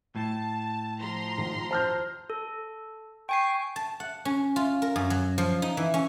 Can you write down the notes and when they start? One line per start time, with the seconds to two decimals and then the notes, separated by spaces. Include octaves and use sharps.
0.16 A2 A5
0.99 F3 A#5 C6
1.38 G#2 D#3
1.71 C5 A5 F6 G6
2.30 A4
3.29 G5 G#5 C#6 C7
3.76 A5
4.00 F#5
4.25 C#4
4.56 F4
4.82 A#4
4.96 F#2
5.10 F#3
5.38 F3
5.62 D#4
5.77 E3
5.94 C#4